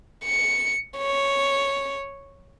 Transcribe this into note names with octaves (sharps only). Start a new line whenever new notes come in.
C#7
C#5